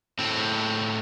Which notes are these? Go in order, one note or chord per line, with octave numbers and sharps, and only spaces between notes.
A2 C4